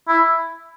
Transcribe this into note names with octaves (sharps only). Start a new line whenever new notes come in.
E4